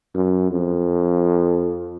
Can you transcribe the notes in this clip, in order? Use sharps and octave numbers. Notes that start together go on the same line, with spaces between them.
F#2
F2